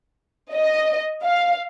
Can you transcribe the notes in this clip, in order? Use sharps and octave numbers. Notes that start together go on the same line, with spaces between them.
D#5
F5